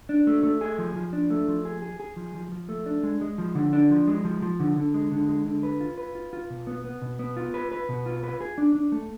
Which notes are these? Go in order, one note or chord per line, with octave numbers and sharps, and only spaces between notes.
D4
A3
A3
G#4
F3
F3
D4
A3
F3
G#4
G#4
G#4
F3
F3
F3
A3
D4
G#3
G#3
F3
D3
D4
F3
G#3
F3
F3
D3
D3
G#3
D3
G#3
D3
B4
F4
B4
F4
F4
B2
B3
B3
B2
B3
F4
B4
B4
B2
F4
B4
G#4
D4
D4
A3